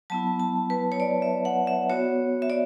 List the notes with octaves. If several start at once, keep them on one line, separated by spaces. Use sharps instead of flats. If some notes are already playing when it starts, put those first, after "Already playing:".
F#3 B3 E4 A5
A5
B4
C#5
D5
E5
F#5
E5
B3 F#4 C#5
E5
D5